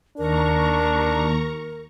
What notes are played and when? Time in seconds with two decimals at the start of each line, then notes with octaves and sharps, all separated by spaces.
0.18 D#2 D4 A#4 A#5 C#6